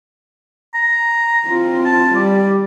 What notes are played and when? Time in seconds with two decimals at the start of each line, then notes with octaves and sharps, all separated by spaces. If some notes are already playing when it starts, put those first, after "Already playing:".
0.74 A#5
1.48 C4 F4
1.85 A5
2.15 G3 D5